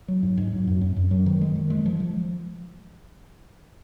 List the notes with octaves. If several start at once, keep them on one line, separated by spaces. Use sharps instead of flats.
F#3
G#2
G#2
F#3
F#2
F#2
F#2
F#3
D#3
G#3
D#3
G#3
F3
F3